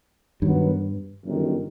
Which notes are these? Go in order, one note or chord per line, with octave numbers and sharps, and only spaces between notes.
G2 D#3 F#3 B3
G1 F#2 D#3